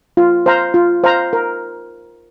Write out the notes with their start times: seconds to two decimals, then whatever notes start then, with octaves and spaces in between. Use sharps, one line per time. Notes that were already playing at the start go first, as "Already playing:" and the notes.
0.17 F4
0.46 C5 F5 A#5
0.74 F4
1.04 C5 F5 A#5
1.33 A#4